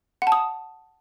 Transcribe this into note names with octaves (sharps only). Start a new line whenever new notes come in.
F#5
A5
D#6